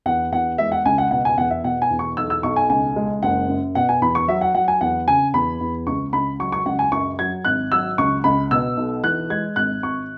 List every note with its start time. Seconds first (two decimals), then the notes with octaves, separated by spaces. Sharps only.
0.06 E2 F#5
0.32 E2 F#5
0.58 G#3 E5
0.72 F#5
0.85 C#2 G#5
0.98 F#5
1.11 B2 F#5
1.25 G#5
1.38 E2 F#5
1.50 E5
1.64 B2 F#5
1.82 G#5
1.90 E2
1.99 C#6
2.17 B1 E6
2.30 E6
2.43 B1 C#6
2.56 G#5
2.70 C#2 G#5
2.96 G#3
3.23 F#1 F#5
3.49 F#2
3.75 B2 F#5
3.89 G#5
4.02 E2 B5
4.15 C#6
4.28 F#3 E5
4.41 F#5
4.54 F#3 F#5
4.68 G#5
4.81 E2 F#5
5.08 C#3 G#5
5.34 E2 B5
5.61 E2
5.87 C#2 C#6
6.13 C#2 B5
6.39 F#3 C#6
6.52 C#6
6.66 C#2 F#5
6.79 G#5
6.92 F#2 C#6
7.19 F#3 G#6
7.45 G#1 F#6
7.72 F#3 E6
7.98 C#2 C#6
8.24 C#2 B5
8.51 B2 E6
8.77 B1
9.03 E3 F#6
9.30 G#3 G#6
9.56 G#1 F#6
9.83 G#1 C#6